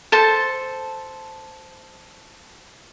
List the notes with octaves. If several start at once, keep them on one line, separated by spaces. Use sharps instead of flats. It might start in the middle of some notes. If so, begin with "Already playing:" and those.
A4 C5 A5